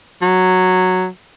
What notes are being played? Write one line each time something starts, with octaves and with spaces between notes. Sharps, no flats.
F#3